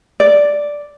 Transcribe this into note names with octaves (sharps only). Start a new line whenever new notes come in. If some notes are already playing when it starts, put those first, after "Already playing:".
D5